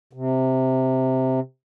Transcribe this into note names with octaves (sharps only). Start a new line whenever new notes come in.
C3